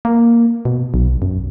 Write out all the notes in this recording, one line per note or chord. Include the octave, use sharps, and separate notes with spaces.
A#3
B2
B1
F#2